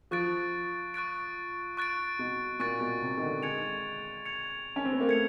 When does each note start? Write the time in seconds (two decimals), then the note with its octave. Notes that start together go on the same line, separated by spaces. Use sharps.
0.11 F3 C#6 F#6 A6 D7
0.94 C#6 F#6 A6 D7
1.77 C#6 F#6 A6 D7
2.19 B2
2.59 A#2 C#6 F#6 A6 D7
2.81 B2
3.02 C3
3.17 D#3
3.22 D3
3.43 G#3 G#6 C#7 F7
4.25 G#6 C#7 F7
4.76 C#4
4.85 C4
4.93 B3
5.00 A#3
5.08 A3 G#6 C#7 F7